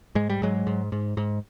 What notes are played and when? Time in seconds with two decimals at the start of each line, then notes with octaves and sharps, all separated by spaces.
0.15 G#2 G#3
0.30 G3
0.42 G#2 F#3 G#3
0.67 G#2
0.92 G#2
1.17 G#2